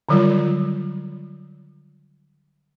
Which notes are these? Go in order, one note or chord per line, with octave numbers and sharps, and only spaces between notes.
D3 D#3 F#3 G3 F4